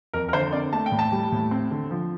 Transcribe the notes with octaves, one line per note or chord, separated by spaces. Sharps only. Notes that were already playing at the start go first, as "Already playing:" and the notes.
F2 A#4
A#4
D3 C5
C4 D5
A3 A5
G5
A2
A5
G3
A2
C4
D3
F3